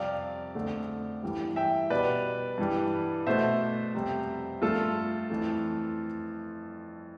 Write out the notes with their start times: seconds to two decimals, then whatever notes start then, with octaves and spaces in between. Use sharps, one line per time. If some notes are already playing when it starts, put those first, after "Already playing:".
Already playing: F2 C3 G3 D5 F5
0.55 F2 D3 A3
1.23 G2 E3 G3
1.56 E5 G5
1.90 B2 G3 B4 D5
2.58 G2 E3 G3
3.26 B2 A3 C5 E5
3.94 F2 C3 G3
4.62 G2 F3 A3 F4 A4
5.30 F2 E3 A3